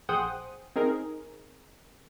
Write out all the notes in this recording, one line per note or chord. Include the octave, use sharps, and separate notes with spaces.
A#1 G#4 C5 F#5 G5 D#6
C4 D#4 G#4 A#4